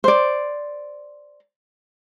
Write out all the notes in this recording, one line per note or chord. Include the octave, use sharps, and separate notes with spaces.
C5 D5